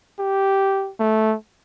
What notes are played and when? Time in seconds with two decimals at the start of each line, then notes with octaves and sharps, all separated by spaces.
0.19 G4
1.00 A3